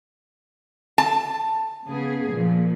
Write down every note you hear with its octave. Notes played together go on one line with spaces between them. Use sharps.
A5
C#3 B3 G#4
A#2 F3